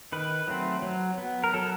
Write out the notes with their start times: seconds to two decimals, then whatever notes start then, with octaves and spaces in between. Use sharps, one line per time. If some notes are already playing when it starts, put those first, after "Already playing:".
0.12 D#3 B4
0.48 F#3 A3 C4
0.82 F#3
1.18 B3
1.44 A#4
1.54 F#3 A4